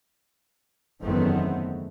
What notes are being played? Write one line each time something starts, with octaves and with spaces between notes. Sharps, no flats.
F#1 E2 D#3 A3 B3 C4